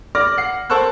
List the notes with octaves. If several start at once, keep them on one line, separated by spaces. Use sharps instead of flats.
D5 D6 F6 A#6
F#5 C7
A#4 C5 A5 C#6 E6 F#6